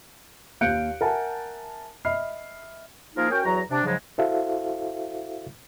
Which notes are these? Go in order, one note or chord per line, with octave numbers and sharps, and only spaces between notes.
D#2 F5 F#6 G6 C#7 D7
A#4 E5 F#5 G#5 A5
D#5 E5 B5 F6 C7
F3 A#3 D#4 F4 G#4 A#4
C#4 F#4 A#4 C#5 G5
E2 F#3 F#4 A#5
C3 D4
G#2 C#3 F3 F#3 G#3
E4 F#4 A4 C5 E5 F5